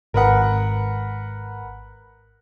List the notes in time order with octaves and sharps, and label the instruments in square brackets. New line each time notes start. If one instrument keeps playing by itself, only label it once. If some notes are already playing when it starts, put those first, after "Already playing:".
[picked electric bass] G#1 [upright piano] A#4 B4 F#5